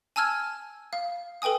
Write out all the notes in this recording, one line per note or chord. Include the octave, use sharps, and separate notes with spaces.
G#5 A5 E6 F6 G#6
F5
A4 B4 G5 G#5 D#6